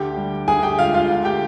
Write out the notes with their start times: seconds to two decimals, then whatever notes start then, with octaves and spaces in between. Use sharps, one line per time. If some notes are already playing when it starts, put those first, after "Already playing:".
Already playing: D2 G4 G5
0.17 G3
0.47 D2 G#4 G#5
0.63 G4 G5
0.79 G#3 F4 F5
0.94 F4 F5
1.09 D2
1.25 G4 G5